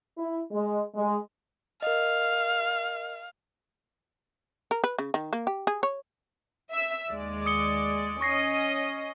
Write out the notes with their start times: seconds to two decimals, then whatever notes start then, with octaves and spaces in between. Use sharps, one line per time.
0.18 E4
0.51 G#3
0.95 G#3
1.82 A#4 D#5 F5
4.71 A#4
4.84 B4
4.99 C#3
5.14 D#3
5.33 A#3
5.47 G4
5.67 G#4
5.83 C#5
6.70 E5 E6
7.09 D#2 G#3 D5
7.46 D#6 C#7 G7
8.21 C#4 D#5 C#6 A#6 C7